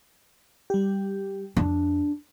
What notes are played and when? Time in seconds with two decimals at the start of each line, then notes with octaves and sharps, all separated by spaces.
0.70 G3 G4
1.57 F2 D4